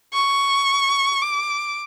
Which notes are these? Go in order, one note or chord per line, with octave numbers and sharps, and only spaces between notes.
C#6
D6